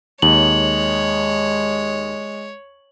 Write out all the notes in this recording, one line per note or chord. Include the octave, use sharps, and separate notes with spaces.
D#2 G#3 C#5 F#7